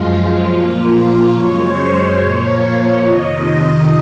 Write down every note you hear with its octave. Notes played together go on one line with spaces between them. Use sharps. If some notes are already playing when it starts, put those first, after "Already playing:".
Already playing: F#2 F3 G#3 F4
A#2 F3 A#3
F#2 C#3 G#3 C#5
C5
C#5
A#2 F3 A#3 C#5
C#5
F2 C3 D#3 D#5